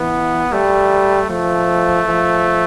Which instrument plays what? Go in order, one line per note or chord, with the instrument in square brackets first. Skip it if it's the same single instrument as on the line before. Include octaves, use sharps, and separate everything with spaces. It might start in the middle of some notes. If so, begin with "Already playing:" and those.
Already playing: [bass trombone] E3 [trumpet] B3
[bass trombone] G3 [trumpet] A3
[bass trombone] F3 [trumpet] A3
[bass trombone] F3